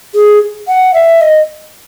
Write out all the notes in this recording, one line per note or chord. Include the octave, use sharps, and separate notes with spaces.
G#4
F#5
E5
D#5